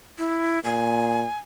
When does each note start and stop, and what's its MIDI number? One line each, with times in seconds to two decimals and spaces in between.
0.19 0.59 64
0.64 1.26 46
0.64 1.38 80